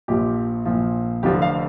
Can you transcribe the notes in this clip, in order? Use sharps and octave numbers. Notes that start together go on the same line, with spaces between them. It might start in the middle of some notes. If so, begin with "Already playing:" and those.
A#1 A#2 F3 G4
A#1 A#2 F3
F1 F2 D3 F3 G4
F5